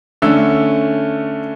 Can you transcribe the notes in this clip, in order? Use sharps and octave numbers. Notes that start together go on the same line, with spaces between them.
D3 A3 C#4 E6